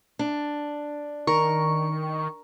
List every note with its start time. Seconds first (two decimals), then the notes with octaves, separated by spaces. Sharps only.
0.19 D4
1.27 D#3 A#4 C#6